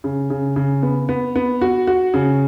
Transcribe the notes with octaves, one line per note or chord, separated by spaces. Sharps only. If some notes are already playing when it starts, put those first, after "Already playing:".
C#3
C#3
C#3
B3
B3
B3
F#4
F#4
C#3